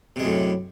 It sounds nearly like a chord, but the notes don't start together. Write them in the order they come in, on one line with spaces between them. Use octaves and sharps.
C3 G#3 F#2 A2